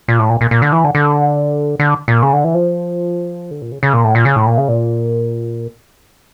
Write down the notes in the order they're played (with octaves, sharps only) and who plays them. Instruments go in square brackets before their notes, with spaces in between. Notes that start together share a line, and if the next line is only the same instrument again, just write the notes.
[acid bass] A#2
A2
A#2
A#2
A#2
D3
E3
D3
D3
D3
A#2
C#3
D3
E3
F3
D3
A#2
C#3
C#3
A#2
A2
A#2
C#3
A2
A#2
C#3
A#2